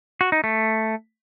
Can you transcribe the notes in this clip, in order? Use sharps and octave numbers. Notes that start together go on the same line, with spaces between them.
F#4
D#4
A3